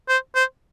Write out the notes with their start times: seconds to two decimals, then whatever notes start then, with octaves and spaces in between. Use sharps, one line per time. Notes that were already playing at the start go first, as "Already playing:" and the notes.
0.09 C5
0.36 C5